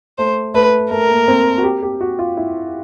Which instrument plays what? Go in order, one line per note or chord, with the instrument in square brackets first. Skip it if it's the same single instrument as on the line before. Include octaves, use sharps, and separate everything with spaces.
[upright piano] A3 [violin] C5
[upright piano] A3 [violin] B4
[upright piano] A3 [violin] A#4
[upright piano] A#3
C4
F#4
G4
G4
F#4
F4
E4